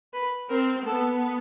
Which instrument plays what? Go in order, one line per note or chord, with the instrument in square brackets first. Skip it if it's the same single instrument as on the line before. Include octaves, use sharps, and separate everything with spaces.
[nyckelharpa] B4
[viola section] C4 [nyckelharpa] A#4
[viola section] B3 [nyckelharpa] A4